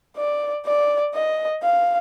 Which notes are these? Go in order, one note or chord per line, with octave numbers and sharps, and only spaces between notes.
D5
D5
D#5
F5